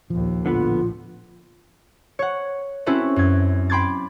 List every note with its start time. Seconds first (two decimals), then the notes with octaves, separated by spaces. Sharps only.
0.10 A#1 D#2 F3
0.46 A#1 A2 D3 B3 F4 B4
2.19 C#5 F#5
2.86 C4 C#4 E4 F#4 A4 B4
3.16 F#2 G#6
3.70 G5 B5 C6 D6 G#6 A6